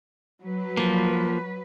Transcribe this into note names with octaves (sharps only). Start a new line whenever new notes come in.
F#3 B4
F3 A#3